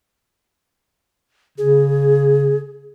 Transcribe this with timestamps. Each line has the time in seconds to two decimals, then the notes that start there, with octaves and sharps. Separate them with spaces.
1.58 C#3 G#4